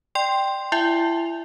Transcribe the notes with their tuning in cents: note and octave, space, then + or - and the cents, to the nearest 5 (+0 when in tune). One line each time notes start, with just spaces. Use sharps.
D5 +25 G5 +0 C6 +0
E4 +30 E5 +0 G#5 -20